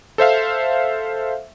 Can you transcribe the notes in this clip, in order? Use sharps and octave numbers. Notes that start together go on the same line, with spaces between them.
A4 C5 E5 F5